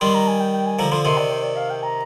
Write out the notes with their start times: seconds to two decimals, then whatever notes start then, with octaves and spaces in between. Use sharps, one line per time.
0.01 D#3 G3 C6
0.14 A#5
0.27 G#5
0.40 G5
0.53 G5
0.66 G#5
0.79 D3 F3 A#5
0.92 D3 F3 C6
1.05 C3 D#3 C6
1.18 D5
1.30 C5
1.43 D5
1.56 F5
1.70 G5
1.83 A#5